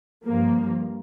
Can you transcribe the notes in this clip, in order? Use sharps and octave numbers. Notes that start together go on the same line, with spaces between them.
G2 F3 A#3